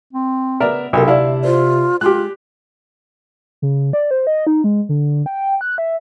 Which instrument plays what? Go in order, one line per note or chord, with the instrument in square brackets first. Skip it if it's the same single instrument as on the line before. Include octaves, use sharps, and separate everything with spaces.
[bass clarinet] C4
[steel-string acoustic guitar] C#3 B3 [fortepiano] A#4 D5 E5
[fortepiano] B1 A4 [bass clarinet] C3 [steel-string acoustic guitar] E4 F4 A#4
[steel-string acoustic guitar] D2 D5 A5 [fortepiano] E4 F5
[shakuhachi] F4 [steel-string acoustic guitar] C5
[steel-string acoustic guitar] G#3 [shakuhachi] F4 [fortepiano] G4 F#6
[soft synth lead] C#3
D5
C5
D#5
D#4
G#3
D3
G5
F#6
E5